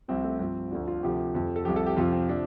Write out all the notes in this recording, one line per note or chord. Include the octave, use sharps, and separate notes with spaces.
C2 C3 F3 C4
A3
G2 F3 C4
D2 D3 F3 D4
F4
D2 C3 F3 G4
F2 F3
A4
C2 C3 F3 G4
A4
G4
F2 C3 F3 F4
C4
C3 F3 D4